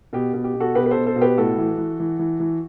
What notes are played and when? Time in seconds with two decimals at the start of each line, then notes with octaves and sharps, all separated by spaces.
0.13 B2 G4
0.34 B2
0.44 G4
0.54 B2
0.60 F#4 A4
0.75 B2 G4 B4
0.86 B4
0.91 A4 C5
0.96 B2
1.06 A4 C5
1.16 B2
1.21 G4 B4
1.37 A2 F#4 A4
1.58 E3
1.78 E3
2.00 E3
2.19 E3
2.40 E3